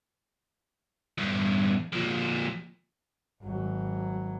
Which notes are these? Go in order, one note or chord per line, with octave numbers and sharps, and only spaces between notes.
E2 G2
F2 A#2
G#1 F#3